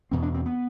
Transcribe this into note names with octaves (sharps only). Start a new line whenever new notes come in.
E2 B2 C4
D4
C4
B3